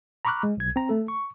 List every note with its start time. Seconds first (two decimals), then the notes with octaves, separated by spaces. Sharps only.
0.25 A#5 B5 C#6 D6 F6 F#6
0.43 G#3
0.57 B1 G#6
0.76 C4 A#5
0.89 A3 A4
1.08 C#6